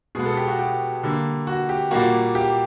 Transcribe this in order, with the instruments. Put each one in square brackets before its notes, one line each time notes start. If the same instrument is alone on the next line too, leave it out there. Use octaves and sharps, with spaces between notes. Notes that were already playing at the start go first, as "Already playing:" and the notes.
[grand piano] B2 G#3 B3 G#4
A4
G4
F#4
G4
D3 G3 A#3
F#4
G4
A#2 G3 A#3 F#4
G4